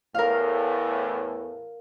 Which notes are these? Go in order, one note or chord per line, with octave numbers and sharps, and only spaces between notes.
E2 A2 A#4 F5